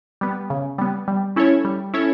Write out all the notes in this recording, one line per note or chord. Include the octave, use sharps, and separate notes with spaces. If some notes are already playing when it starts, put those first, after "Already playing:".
G3 B3
C#3
G3 B3
G3
C#4 E4 A4 C#5
G3
C#4 E4 A4 C#5